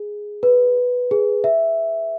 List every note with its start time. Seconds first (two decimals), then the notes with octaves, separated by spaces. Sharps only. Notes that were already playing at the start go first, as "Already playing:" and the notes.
Already playing: G#4
0.43 B4
1.11 G#4
1.44 E5